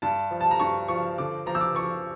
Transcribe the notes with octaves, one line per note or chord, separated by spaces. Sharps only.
G2 A5
F3
A5
A#5
G2 C#6
F3 C#6
D3 D6
F3 A#5
E6
D6
F3 C#6